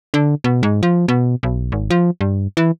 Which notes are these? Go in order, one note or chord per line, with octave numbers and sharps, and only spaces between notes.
D3
B2
G#2
F3
B2
B1
G#1
F3
G2
E3